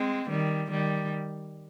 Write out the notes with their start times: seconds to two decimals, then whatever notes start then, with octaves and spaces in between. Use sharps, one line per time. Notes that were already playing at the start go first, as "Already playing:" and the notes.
Already playing: G#3 C4
0.30 D#3 G3
0.71 D#3 G3